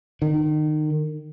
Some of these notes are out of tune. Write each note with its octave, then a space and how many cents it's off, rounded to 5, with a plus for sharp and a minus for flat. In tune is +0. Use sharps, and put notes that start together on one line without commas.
D#3 -25